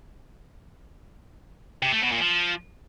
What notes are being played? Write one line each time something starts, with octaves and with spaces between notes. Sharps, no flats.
C3
A3
B2
A#2
F3